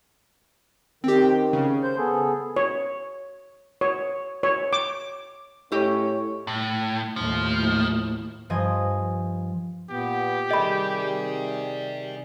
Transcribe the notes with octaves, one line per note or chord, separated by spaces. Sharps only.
D#3 C4 G4
C#3
C5 G6
B3 G#4 A4
C#5
C#5
C#5
D6
A2 C#4 E4 G4 C#5 D#5
A2
D#2 A2 F3
G2 F3 D#5 G#5 D#6 A#6
A#2 B3 G4
C3 D#3 G#4 D5 D#5 G5 B5